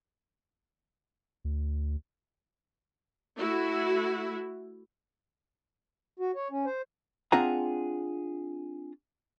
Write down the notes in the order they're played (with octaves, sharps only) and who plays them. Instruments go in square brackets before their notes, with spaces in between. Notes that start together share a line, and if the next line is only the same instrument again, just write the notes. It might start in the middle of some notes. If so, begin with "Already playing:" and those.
[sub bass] D2
[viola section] A3 E4 F#4
[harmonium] F#4
C#5
C#4
C5
[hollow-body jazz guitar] C4 D4 F4 G#4 F#5 A#5